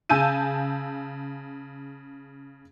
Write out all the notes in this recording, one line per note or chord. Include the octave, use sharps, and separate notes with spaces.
C#3 G#5 A5 E6 G6 D#7